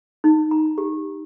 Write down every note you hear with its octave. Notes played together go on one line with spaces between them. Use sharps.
D#4
A#5
G4